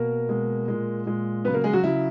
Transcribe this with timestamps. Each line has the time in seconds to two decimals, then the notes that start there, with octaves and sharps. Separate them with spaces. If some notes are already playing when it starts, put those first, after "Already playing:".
Already playing: B2 A#3 A#4
0.29 B2 G#3
0.68 A#2 G#3
1.06 A#2 G#3
1.45 C#3 F#3 B3 B4
1.54 A#3 A#4
1.64 G#3 G#4
1.73 F#3 F#4
1.83 C#3 F#3 E4